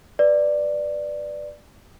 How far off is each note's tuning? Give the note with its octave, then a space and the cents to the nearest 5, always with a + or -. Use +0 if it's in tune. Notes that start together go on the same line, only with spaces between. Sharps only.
B4 +0 D5 +5